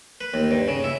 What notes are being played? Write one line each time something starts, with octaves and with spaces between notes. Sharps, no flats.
B4
D#2
G2
C#3
E4